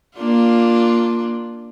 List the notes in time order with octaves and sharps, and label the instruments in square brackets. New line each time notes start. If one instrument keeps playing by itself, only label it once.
[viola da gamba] A#3 D4 F4